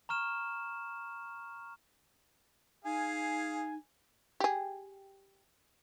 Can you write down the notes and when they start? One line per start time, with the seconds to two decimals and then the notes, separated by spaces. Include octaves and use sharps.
0.09 A#5 C#6 F6 E7
2.85 D#4 G#4 F5 G#5
4.40 G4 G#4